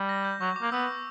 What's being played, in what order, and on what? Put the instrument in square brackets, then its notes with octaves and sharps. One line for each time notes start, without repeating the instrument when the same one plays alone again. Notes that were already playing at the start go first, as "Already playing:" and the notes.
Already playing: [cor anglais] G3
[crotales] A#6
G6
[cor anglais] F#3 [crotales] C#6
[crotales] D6
[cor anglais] A#3
[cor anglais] B3 [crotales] E6